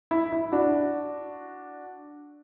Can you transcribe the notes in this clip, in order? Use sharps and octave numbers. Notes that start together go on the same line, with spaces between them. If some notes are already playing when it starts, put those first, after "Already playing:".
E4
E4
D4 F#4